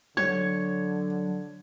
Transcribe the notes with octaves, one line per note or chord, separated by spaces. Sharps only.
D3 F#3 C#5 G#6